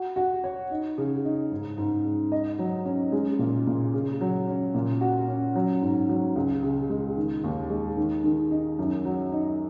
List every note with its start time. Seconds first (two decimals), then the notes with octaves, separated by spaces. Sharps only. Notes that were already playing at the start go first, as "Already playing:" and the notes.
Already playing: F#4
0.16 F#4
0.44 C#5
0.70 D#4
0.98 C#3
1.24 D#4
1.52 G#2
1.78 G#2
2.05 G#2
2.32 D#5
2.59 F#3
2.85 C#4
3.12 G#3
3.39 A#2
3.67 A#2
3.94 C#3
4.21 F#3
4.47 C#4
4.75 A#2
5.01 F#4
5.28 C#4
5.55 F#3
5.82 G#2
6.09 F#3
6.36 C#2
6.63 C#3
6.90 G#3
7.16 D#3
7.44 D#2
7.70 G#3
7.97 D#3
8.24 D#3
8.51 D#4
8.79 F#2
9.05 F#3
9.32 D#4